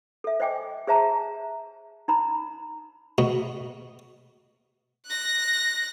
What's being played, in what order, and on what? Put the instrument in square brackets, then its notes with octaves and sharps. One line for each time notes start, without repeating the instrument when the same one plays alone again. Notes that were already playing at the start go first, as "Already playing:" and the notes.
[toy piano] A4 E5
C5 D#5 G5 G#5 D6
G#4 C5 E5 A5 A#5
D#4 A#5 B5
[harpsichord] B2
[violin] F#6 A#6